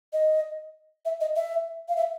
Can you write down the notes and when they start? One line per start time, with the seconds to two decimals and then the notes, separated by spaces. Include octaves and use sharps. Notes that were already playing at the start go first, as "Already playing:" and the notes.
0.13 D#5
1.05 E5
1.21 D#5
1.36 E5
1.89 F5
1.97 E5